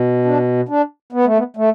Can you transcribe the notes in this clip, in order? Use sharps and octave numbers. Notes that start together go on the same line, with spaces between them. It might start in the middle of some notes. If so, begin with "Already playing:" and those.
Already playing: B2
D4
D4
B3
A3
B3
A3